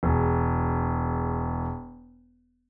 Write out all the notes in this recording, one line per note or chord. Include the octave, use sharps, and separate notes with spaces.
E1 G#4